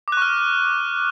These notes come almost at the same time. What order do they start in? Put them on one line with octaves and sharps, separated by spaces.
D6 F#6 C#6 F6